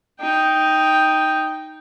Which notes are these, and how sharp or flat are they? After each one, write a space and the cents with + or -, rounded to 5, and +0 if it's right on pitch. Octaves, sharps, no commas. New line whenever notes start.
D#4 +0 G5 +0